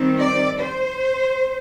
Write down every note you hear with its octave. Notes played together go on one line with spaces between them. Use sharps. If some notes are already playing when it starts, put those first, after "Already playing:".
Already playing: D#3 G3 C4
D5
C5